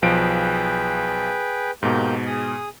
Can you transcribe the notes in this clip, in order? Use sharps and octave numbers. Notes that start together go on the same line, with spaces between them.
B1 F3 G#4 B4 G5 D7
G#2 B2 A#3 G4 G6
G#4 D#6